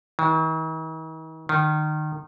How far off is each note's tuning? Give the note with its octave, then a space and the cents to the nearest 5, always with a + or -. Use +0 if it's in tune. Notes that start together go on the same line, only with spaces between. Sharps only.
D#3 +45
D#3 -25